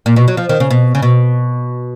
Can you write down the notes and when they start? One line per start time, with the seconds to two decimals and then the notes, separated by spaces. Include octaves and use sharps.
0.06 A#2
0.16 B2
0.28 F#3
0.37 F3
0.49 D#3
0.60 C#3
0.70 B2
0.95 C#3
1.02 B2